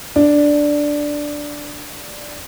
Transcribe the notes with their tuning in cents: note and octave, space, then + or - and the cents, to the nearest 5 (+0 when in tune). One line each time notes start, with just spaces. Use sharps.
D4 +0